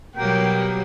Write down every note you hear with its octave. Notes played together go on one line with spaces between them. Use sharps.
B2 F#3 G3 A#3 G4 G5